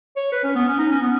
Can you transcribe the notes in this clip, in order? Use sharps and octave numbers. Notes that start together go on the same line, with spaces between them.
C#5
B4
C#4
B3
C#4
D#4
C#4
B3